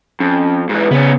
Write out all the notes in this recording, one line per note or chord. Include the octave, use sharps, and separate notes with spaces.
F2 C#4
G#2 E3 B4
C#3 B3 C#4